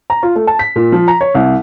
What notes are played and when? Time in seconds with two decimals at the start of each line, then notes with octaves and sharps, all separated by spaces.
0.10 A#5
0.23 F4
0.36 A3
0.47 A5
0.59 B6
0.76 A#2
0.92 F3
1.08 A#5
1.21 C#5
1.35 C2